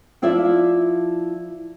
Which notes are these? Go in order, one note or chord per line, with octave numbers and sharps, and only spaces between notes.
F3 E4 F4 D5 E5